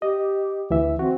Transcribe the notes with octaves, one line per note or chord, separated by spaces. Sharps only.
G4 D#5
D2 E3 E5
C4 F#4